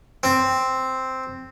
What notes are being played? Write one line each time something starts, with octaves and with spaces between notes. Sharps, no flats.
C4